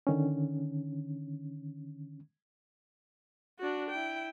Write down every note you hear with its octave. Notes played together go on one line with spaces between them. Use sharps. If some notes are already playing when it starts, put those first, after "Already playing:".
D3 D#3 C#4
D4 F#4
E4 G5